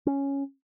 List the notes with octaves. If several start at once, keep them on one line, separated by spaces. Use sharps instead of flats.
C#4